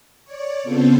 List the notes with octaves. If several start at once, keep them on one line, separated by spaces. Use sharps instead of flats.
C#5 D5
C#3 B3 C4 F4 A4 C5